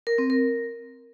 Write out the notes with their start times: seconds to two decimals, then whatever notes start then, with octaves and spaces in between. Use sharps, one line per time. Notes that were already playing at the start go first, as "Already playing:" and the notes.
0.07 A#4
0.18 C4
0.30 A#4